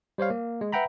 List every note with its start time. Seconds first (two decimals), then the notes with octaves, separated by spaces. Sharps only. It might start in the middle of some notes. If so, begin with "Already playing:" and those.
0.18 G3 C5 C#5 F5
0.30 A#3
0.61 G#3
0.72 B4 E5 F#5 G5 A#5 B5